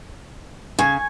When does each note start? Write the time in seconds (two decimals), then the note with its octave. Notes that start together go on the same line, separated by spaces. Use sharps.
0.79 C#3 G#5 C#6